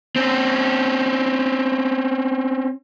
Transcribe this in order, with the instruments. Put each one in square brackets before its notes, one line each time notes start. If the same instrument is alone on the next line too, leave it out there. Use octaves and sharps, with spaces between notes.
[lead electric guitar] C4 C#4